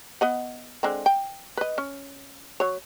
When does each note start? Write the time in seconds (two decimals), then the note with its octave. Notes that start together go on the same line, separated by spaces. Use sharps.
0.21 B3 D#5 F#5
0.83 D3 G#3 C4
1.06 G5
1.57 B4 D#5
1.78 C#4
2.60 F#3 C#5